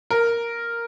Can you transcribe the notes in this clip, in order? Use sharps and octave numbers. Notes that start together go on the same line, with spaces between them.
A#4